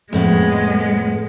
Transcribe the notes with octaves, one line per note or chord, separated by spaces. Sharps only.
F2 A2 G#3 B3